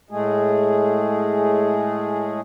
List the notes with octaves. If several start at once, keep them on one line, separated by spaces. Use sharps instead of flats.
A2 G#3 A3 G#4